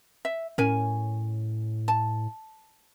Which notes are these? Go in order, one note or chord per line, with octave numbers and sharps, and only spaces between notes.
E5
A2 C#4 A#4 G#5
A5